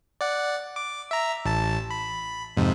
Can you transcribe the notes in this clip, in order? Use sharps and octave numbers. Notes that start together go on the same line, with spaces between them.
D5 F#5
D6
E5 A#5
A1 A5
B5
F2 G#2 C3